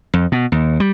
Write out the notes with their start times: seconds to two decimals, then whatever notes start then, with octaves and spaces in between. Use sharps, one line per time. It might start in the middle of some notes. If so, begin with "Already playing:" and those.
0.14 F2
0.32 B2
0.52 D#2
0.80 G3